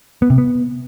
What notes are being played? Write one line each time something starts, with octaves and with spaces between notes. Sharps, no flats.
B3
C3
B3